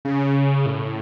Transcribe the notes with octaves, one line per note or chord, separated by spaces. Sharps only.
C#3
A2